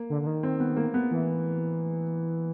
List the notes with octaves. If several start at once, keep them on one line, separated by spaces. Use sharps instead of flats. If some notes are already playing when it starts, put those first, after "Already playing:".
Already playing: A#3
D3
D3
D#3
C4
B3
A#3
B3
E3